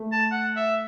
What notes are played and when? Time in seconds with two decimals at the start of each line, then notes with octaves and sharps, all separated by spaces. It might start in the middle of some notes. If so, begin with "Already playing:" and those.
Already playing: A3
0.12 A5
0.31 F#5
0.56 E5